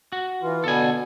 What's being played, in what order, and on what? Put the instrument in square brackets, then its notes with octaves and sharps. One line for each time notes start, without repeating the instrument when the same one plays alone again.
[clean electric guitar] F#4
[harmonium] E3 F4
[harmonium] B2 D3 B3 [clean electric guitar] A4 G#5